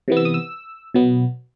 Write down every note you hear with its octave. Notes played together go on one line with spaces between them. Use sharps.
C3 E3 B3
E6
D#6
E6
B2 F#3 B3